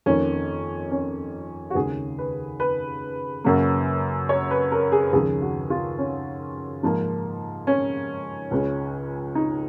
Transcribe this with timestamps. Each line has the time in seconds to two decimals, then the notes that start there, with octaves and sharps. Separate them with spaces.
0.06 F2 D#3 A#3 C#4
0.91 C#4
1.70 F#4
1.75 D#2 C#3 G#3 G#4
2.18 B4
2.60 B4
3.44 F#2 C#3 F#3 A#3
4.29 C#5
4.51 B4
4.72 A#4
4.92 G#4
5.13 D#2 C#3 F3 G#3 G#4
5.42 F#4
5.70 F4
5.99 C#4
6.83 G#2 F3 A#3
7.67 C#4
8.51 C#2 C#3 G#3
9.35 D#4